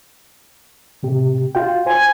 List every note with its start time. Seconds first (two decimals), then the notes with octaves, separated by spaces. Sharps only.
1.03 A2 C3 G4
1.55 F4 F#4 G5
1.86 C5 G#5